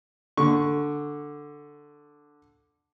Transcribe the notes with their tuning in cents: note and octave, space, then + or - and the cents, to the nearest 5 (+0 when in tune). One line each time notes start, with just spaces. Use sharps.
D3 +0 C#6 +0